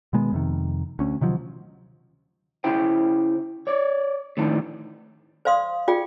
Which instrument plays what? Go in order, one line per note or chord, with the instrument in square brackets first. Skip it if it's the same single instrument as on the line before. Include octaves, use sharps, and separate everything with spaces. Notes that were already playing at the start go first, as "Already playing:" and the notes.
[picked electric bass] B2 D#3 G#3 B3
F2 C3 D#3
D2 C#4
C3 D#3 F3 F#3
[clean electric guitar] C#3 E4 C5 G5
C#5 D5
A2 D#3 E3 D4
[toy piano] C5 D5 F5 C6 D#6
F4 G#4 D5 G5